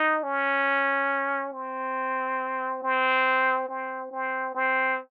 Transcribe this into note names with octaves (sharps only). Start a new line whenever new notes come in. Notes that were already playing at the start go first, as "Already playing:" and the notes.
Already playing: D#4
C#4
C4
C4
C4
C4
C4